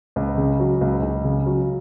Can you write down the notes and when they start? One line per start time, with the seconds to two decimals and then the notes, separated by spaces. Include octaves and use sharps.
0.16 C#2
0.38 C#3
0.60 F#3
0.81 C#2
1.03 C#2
1.24 C#3
1.46 F#3